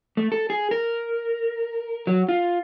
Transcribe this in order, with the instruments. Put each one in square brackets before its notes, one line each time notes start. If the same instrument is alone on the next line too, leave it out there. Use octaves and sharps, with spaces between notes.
[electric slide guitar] A3
A4
G#4
A#4
F#3
F4